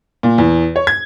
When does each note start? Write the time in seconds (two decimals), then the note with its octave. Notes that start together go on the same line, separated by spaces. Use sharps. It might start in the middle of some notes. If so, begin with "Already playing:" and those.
0.23 A#2
0.38 E2
0.76 C#5
0.87 G#6